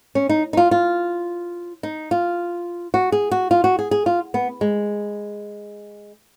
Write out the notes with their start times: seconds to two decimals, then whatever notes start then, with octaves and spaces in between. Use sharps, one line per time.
0.15 C#4
0.29 D#4
0.53 D#4
0.57 F4
0.71 F4
1.83 D#4
2.11 F4
2.94 F#4
3.12 G#4
3.31 F#4
3.51 F4
3.64 F#4
3.79 G#4
3.91 G#4
4.06 F4
4.34 B3
4.61 G#3